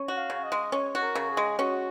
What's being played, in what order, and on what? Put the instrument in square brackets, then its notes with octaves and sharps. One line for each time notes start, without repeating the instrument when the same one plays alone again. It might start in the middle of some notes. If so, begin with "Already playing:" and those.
Already playing: [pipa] C#4
F#4
[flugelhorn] F5
[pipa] C#3
[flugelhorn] D#5
[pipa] G#3
[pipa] C#4 [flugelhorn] C#5
[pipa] F#4
[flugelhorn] A#4
[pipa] C#3
[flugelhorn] G#4
[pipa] G#3
[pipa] C#4 [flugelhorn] F#4